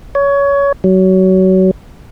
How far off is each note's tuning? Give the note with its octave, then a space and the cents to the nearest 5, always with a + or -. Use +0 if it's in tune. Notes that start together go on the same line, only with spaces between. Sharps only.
C#5 +20
F#3 +25